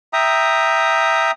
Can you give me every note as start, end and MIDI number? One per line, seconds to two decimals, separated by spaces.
0.13 1.31 76
0.13 1.31 79
0.13 1.31 82
0.13 1.31 87